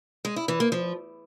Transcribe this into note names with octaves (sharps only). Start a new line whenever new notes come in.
G#3
E4
E3
A#3
F3